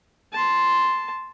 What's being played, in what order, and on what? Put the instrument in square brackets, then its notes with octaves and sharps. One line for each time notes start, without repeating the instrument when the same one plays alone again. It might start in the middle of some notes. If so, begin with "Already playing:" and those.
[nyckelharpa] A5 C6